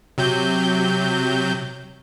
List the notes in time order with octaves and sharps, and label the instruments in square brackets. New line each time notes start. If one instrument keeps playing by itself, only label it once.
[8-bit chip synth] C3 F#3 G6